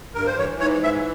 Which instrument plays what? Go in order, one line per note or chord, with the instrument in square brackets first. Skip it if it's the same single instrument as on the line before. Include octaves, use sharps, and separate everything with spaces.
[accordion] G2 A#4
C5
E3 C#5
G#2 C#5
E3 E5